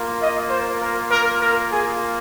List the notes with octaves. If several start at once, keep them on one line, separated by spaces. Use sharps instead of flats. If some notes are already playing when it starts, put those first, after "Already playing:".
Already playing: A#3 F4
D#5
C5
A#4
A#4
A#4
G#4